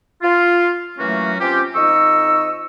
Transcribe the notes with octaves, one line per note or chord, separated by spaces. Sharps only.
F4
E3 F#3 A3 A#3 C#4 F#4
C4 C#4 F4 G4
F2 D#4 D#5 C#6 E6